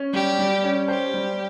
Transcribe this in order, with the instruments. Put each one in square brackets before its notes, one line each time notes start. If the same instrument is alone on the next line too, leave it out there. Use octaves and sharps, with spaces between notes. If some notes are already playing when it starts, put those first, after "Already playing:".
Already playing: [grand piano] C#4
[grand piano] G3 [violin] G4
[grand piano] G3
C#4
[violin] G4 [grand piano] C5
[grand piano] G3